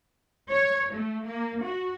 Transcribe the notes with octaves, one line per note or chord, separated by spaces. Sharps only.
C#5
A3
A#3
F#4